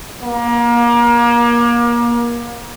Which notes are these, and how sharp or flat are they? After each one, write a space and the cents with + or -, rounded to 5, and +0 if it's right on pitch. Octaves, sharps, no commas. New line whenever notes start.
A#3 +30